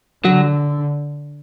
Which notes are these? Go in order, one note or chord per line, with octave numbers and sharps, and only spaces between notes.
D3 F#3